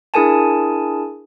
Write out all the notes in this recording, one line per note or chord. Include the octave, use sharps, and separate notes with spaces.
D4 E4 G#4 A#4 G#5 A5